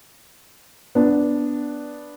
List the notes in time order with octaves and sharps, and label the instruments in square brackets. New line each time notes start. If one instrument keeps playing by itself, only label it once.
[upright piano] B3 D4